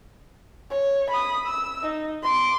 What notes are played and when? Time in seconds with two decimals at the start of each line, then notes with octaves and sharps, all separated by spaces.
0.70 C#5
1.10 B5 D#6
1.46 E6
1.83 D#4
2.23 C6 D6